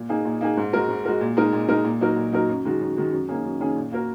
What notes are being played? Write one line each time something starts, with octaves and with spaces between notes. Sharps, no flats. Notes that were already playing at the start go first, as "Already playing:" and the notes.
Already playing: A#2
A#3 D#4 G#4
A#2
A#3 D#4 G#4
G#2
G#3 F#4 A#4
G#2
G#3 F#4 A#4
A#2
G#3 D#4 A#4
A#2
G#3 D#4 A#4
A#2
F#3 D#4 F#4 A#4
A#2
F#3 D#4 F#4 A#4
F#2
D#3 G#3 F#4
F#2
D#3 G#3 F#4
F#2
D#3 A#3 C#4 G#4
F#2
D#3 A#3 C#4 G#4
A#2
A#3 F#4 A#4